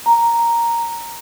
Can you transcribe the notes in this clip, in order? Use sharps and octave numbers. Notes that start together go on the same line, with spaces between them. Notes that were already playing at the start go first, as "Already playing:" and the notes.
A#5